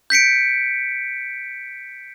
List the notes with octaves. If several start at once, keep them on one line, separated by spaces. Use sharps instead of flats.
G6 B6 C#7 D7